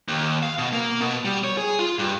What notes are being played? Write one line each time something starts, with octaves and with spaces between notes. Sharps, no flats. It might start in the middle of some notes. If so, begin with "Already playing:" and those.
D#2
F5
B2
A#3
B2
G3
C#5
G#4
F4
G2